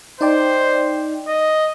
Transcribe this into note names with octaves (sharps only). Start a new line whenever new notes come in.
D#4 C5 D5 G5
D#5